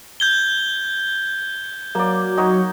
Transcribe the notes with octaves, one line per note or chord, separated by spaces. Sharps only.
G6 G#6 G7
F#3 A#3 D5
D#4 F#4 C#5